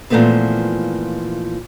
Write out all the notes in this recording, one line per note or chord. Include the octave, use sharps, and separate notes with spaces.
A#2 E3 F3 A3 B3 C4